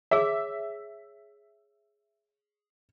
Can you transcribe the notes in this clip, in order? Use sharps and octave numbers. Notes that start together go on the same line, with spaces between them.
G#4 C#5 E5